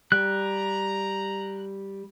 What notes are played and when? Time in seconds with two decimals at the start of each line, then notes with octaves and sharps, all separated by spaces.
0.12 G3 A#5 F#6